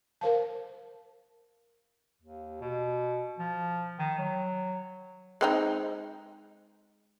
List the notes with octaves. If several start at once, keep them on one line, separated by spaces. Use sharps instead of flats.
A#4 C5 F5 A5
D#2
B2
F3
D#3
F#3
G#3 C4 D#4